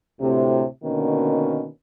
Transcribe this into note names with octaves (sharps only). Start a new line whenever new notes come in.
D2 A2 C3
B2 D3 D#3 A#3 C#4